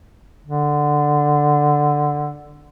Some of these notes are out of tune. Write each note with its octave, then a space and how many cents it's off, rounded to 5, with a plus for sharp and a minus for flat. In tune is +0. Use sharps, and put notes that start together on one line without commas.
D3 +5